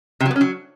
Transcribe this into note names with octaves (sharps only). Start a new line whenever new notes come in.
C3
F#3
B3
C#4
F#3